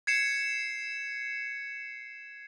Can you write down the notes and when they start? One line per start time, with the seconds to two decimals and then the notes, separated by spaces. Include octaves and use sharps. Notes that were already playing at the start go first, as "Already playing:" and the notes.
0.07 G#6 C7 C#7 E7